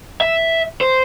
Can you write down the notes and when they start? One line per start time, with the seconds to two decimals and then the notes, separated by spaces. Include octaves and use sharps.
0.21 E5
0.81 C5